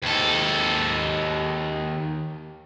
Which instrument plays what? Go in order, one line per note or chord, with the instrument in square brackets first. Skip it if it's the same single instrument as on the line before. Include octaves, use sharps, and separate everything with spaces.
[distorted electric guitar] D#2 A4